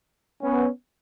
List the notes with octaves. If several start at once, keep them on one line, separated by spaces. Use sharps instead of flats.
B3 C#4